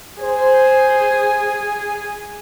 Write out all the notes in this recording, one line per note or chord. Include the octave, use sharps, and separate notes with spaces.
G#4 C5